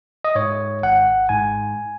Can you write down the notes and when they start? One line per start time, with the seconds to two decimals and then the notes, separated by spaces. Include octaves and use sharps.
0.24 D#5
0.35 G#2 C#5
0.83 G#1 F#5
1.29 G#2 G#5